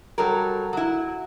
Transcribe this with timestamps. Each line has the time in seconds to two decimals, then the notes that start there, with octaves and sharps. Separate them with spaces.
0.18 F#3 G3 A4 A#4
0.73 F#3 E4